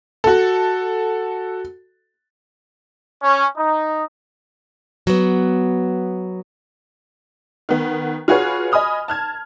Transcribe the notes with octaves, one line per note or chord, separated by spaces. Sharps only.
F#4 A4
C#4
D#4
F#3 B3
D#3 B3
F4 F#4 G#4 B4 C#5
D#5 G#5 B5 D#6 F6
A5 F6 G#6